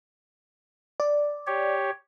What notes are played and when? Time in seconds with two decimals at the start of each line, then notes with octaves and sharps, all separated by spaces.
1.00 D5
1.47 G4 C#5